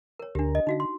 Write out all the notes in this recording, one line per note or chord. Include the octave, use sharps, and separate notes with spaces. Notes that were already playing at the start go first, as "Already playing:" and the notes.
A#4 C#5
D2 D3 D4 G4 A#4
D#5
D3 D#4 F#4 F5
C6